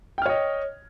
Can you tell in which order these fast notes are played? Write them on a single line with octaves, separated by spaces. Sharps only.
G5 F6 C#5 D#5